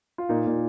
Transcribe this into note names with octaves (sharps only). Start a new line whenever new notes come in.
F4
A#2 D#4
A#2